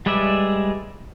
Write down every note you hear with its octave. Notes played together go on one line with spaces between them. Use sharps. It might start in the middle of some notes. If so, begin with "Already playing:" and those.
G3 G#3 B4 D5 E5